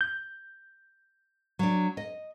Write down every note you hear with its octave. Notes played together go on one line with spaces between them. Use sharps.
G6
F#3 D4
D#5